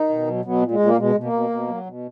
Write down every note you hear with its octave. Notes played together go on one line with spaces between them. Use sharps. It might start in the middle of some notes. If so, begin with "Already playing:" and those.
Already playing: D#3 D#4
B2
F#3
B2 F#3 B3
A#2
G#3
A#2
A#3
B2 G#3
B2
A#3
B2
B2
F#3
B2